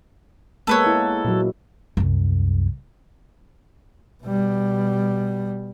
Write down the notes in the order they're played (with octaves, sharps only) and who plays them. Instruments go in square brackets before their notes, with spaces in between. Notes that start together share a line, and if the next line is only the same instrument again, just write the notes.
[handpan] G#3 A#3 B3 [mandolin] A4 B4 C#5
[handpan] E4
A#2 F#3
[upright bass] C2 F#2
[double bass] B2 G3